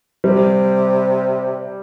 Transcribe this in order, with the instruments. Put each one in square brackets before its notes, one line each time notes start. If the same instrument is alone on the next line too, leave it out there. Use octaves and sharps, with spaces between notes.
[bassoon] C3 [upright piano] G3